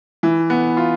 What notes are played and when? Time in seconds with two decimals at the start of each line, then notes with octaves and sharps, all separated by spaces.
0.23 E3
0.50 B3
0.77 F4